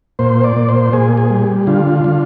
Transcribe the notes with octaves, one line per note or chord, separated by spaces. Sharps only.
A#2 C5
D5
A#2
C5
A#2 G#4
G#4
G3
D3 F4
D3